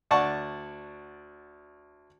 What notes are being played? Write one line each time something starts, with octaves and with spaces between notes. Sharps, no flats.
D2 D5 F#5 A5 C#6